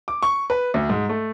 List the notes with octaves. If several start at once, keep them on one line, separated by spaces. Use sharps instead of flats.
D6
C#6
B4
D2
G#2
A3